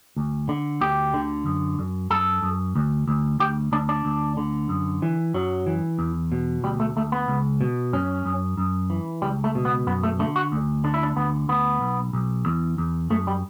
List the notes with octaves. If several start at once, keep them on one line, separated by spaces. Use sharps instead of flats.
D2
D3
D2 G4
D3
F#2
F#2
F#2 A4
F#2
D2
D2
D2 G4
D2 D4
D4
D2
D3
F#2
E3
F#2 F#3
E3
E2
B2
D2 G3
A3
D2 A3
B3
C#2
B2
F#2 C#4
F#2
F#2
E3
C#2 G3
A3
B2
B3
F#2 B3
A3
D3 A3
F#4
D2
D3 D4
E4
D4
D2 B3
D2 B3
B1
B1
E2
E2
F#2 A3
G3